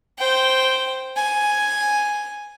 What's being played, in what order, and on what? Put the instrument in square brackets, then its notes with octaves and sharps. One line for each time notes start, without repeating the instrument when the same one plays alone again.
[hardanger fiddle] C5 G5
G#5